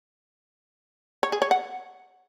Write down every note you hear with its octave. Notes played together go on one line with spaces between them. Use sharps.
C#5
G#4
C#5
F#5